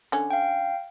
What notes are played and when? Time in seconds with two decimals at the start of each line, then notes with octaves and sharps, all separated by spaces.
0.12 D3 C#4
0.30 F5 G5